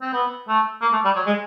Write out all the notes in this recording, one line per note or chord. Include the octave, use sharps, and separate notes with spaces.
C4
B3
A3
A#3
A3
G3
F#3
G#3